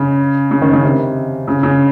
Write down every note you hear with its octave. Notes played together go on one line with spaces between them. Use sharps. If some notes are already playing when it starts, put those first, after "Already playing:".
Already playing: C#3
C#3
D#3
C#3
C3
C#3
C#3